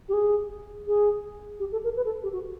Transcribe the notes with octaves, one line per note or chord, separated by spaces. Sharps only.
G4
G#4
G#4
G4
A4
A#4
B4
A4
G4
F#4